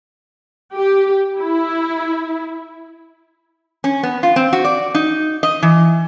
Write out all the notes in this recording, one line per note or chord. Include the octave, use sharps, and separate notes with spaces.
G4
E4
C#4
B3
F4
C4
F#4
D5
D#4
D#5
E3